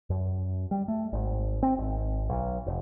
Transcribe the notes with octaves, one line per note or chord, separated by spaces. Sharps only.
F#2
G3
A3
G#1
C4
G#1
B1
F1